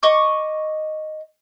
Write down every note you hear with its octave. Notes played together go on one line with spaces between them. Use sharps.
D#5 C#6 D6